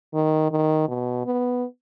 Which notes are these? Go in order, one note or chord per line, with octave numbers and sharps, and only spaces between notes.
D#3
D#3
B2
B3